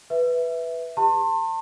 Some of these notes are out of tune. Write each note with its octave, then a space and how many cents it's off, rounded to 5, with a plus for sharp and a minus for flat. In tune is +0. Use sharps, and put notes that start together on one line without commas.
B4 +0 E5 +0
G4 +30 A5 +35 C6 +30